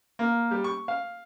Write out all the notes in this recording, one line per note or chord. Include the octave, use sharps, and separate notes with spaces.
A#3
G3
C#6
F5